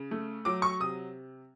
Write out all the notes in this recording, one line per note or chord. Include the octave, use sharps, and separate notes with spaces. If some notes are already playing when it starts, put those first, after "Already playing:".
Already playing: C#3
A3
F#3 D6
C#6
C3 D#6